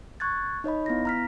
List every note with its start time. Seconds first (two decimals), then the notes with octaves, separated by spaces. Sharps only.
0.20 C#6 F#6 G#6 A6
0.64 D#4 C#5 D#5 B5
0.86 B3 E4 A#6
1.05 A#5 F6 B6